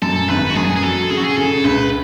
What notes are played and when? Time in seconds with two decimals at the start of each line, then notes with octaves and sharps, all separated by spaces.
0.02 F#2 A4
0.29 G#1 B4
0.50 F#4
0.56 F#2 G#4
0.76 G#4
0.83 F#3 A4
1.10 C#3 G#4
1.18 F#4
1.25 G#4
1.37 C#3 A4
1.64 C#2 B4